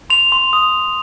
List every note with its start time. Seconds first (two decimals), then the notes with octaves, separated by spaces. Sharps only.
0.10 C6 F7
0.32 C6
0.53 D#6